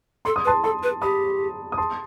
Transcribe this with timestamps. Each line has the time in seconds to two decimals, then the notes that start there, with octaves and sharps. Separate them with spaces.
0.25 A4 C6
0.36 D#6
0.45 B4 A5 C6
0.64 A4 A5 C6
0.83 B4
1.02 G4 B5 D#6
1.72 D#6
1.78 A5 C6